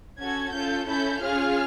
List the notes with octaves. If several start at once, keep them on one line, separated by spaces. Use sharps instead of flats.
C#4 F#4 A4 G#6
C#4 F4 A4 G6
C#4 E4 A4 G6
C#4 F4 G#4 F6